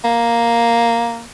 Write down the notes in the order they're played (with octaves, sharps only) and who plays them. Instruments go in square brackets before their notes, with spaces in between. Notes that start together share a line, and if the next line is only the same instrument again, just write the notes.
[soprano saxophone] A#3